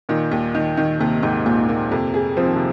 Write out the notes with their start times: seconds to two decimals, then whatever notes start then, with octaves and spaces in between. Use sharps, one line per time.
0.09 A#2 D#3
0.32 D#2
0.55 D#3
0.77 D#3
1.00 D#2 C3
1.23 D#2 G#2
1.46 D#2 A#2
1.69 A#2 A#3
1.91 F2 C3
2.14 G#4
2.37 F3 C4
2.46 D#3
2.56 C3